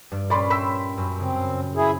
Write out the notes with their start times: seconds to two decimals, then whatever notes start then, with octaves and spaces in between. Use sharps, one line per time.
0.11 G2 G3
0.30 A#2 C#4 D5 B5 C6
0.50 E5 G5 B5 C6 E6 B6
0.97 F#2
1.20 C#3 C4
1.76 E4 G#4